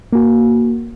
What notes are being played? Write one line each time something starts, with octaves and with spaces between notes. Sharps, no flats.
A#3 F#4